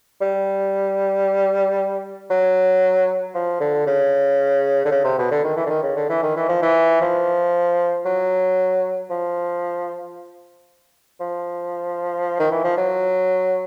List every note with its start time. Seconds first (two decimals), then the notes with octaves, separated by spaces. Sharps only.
0.21 G3
2.30 F#3
3.35 F3
3.60 D3
3.87 C#3
4.85 D3
4.91 C#3
5.04 C3
5.18 B2
5.31 D3
5.43 D#3
5.57 E3
5.66 D3
5.69 D#3
5.83 C#3
5.96 D3
6.09 E3
6.23 D#3
6.36 E3
6.49 F3
6.62 E3
7.02 F3
8.05 F#3
9.10 F3
11.20 F3
12.39 D#3
12.51 E3
12.64 F3
12.77 F#3